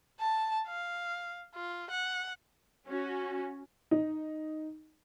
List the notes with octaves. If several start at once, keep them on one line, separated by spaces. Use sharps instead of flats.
A5
F5
F4
F#5
C#4 F#4
D#4